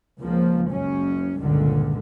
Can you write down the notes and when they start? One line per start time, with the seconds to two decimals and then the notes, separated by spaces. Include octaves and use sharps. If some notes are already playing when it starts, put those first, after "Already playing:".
0.19 C#2 F3 A#3
0.70 F#1 F#2 C#4
1.39 C#2 G2 A#2 D3 D#3